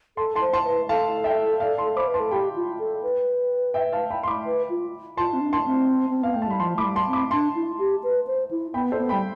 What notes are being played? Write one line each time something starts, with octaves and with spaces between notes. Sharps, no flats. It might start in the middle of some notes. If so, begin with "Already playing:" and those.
A4 A5 C6
A5 C6
C5
A5 C6
B4
A4 F5 A5
E5 G5
D5 F5
A5 C6
C5 B5 D6
B4
A5 C6
A4
G4 G5 B5
F4
A4
B4
E5 G5
F5 A5
G5 B5
C6
B5 D6
B4
F4
F4 A5 C6
C4
D4
A5 C6
C4
C4
B3 F5
A3 G5
A5
G3 B5
F3 A5 C6
A3 B5 D6
G3
A5 C6
C4
B5 D6
D4 A5 C6
E4
G4
B4
C5
E4
B3 G5 B5
A4 C5
B3
G3 G5 B5